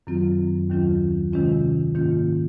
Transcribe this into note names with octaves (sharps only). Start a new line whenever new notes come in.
F#2 D#3 F#3 C4 F4
D#2 D#3 F#3 C#4 F4
C3 D#3 G#3 C#4 F4
G#2 D#3 A#3 C#4 F4